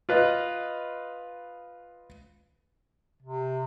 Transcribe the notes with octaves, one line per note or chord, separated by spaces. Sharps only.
F4 B4 D#5
C3